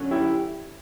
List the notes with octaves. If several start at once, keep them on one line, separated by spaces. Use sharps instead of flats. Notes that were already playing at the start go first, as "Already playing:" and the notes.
Already playing: D3 F#3 C#4
E4 G4